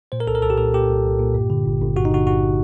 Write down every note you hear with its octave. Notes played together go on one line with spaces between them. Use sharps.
A#2 C5
A#4
C2 A4
A#4
C2 A4
G4
A#2 A4
A#2 G4
C2
C2
A#2
G2
D3
G1
G1
G2 F#4
D#4
D3 F#4
G1 F#4